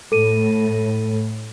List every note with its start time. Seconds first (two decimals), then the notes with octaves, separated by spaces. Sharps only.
0.12 A2 A4 D#7